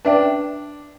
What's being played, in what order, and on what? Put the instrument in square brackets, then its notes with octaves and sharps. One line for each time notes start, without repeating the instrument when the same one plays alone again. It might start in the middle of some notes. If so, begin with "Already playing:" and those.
[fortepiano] D4 [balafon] B4 E5 G5